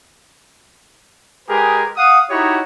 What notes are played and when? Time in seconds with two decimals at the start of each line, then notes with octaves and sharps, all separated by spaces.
1.49 G#3 G4 G#4 A#4 B4
1.97 F5 F#5 D#6
2.31 D#4 E4 F#4 G4 C#5